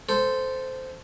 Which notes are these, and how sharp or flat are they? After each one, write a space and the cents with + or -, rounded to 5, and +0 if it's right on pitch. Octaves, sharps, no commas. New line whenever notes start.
A4 +0 C5 -10